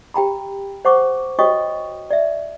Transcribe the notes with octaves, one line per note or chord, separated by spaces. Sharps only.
G4 G5 A#5 B5
C5 F#5 C#6 D6
F#4 C#5 D#5 G5 C#6 D#6
D5 E5